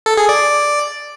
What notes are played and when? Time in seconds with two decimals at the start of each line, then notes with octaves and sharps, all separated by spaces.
0.06 A4
0.17 G#4
0.29 D5